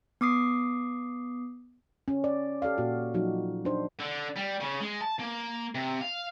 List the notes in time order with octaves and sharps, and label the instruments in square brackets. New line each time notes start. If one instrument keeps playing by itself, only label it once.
[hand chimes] B3 D6 D#6 C7
[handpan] C#4
D5
G4 A4 D5 F5
A#2 F#4
F3 F#3 D#4 F#4
D4 D#4 C5
[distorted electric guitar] D3
G3
C#3
G#3
A5
A#3
C3
F5